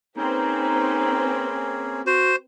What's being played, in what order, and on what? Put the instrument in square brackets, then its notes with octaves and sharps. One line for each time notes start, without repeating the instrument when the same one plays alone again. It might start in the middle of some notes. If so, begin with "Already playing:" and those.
[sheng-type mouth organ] A#3 C#4 G#4 [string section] C4 B4 [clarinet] D#4
[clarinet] F#4 [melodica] C5